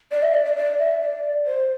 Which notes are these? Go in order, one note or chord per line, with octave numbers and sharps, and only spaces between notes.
D5
E5
D5
D5
D5
E5
D5
C5